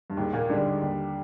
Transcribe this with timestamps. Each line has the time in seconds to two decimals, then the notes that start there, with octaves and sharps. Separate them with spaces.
0.10 G2
0.17 D#2 G#2
0.33 A#2
0.49 G#2 D3 G3 D4
0.65 G#2
0.82 D#2